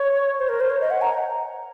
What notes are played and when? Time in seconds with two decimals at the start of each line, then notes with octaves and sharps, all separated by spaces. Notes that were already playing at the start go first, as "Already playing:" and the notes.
Already playing: C#5
0.39 C5
0.49 A#4
0.60 C5
0.70 C#5
0.81 D#5
0.90 F#5
1.02 A#5